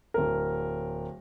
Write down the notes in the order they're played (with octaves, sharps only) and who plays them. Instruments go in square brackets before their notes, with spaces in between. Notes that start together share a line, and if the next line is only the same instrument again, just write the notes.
[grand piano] D1 A#4